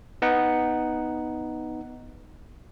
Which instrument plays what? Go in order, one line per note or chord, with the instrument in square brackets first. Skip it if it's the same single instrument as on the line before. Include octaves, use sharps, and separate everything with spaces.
[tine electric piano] B3 D#4 F#5